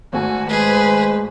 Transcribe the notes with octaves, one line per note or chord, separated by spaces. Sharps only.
G#1 A3 F#4 G#5
G#3 G#4 B4 C5